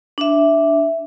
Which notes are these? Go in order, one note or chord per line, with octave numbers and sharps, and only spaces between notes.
D4 E5